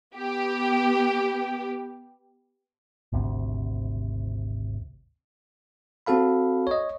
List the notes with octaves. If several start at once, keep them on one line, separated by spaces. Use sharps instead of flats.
B3 G4
G#1 D2 C3
C4 F#4 A4 F5 B5
C#5 D#5